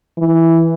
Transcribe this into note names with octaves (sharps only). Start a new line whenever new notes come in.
E3